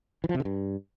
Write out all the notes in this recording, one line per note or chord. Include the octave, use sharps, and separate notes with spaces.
E3
F3
C3
D3
G2